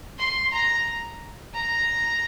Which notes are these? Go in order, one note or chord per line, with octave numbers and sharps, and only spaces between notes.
C6
A#5
A#5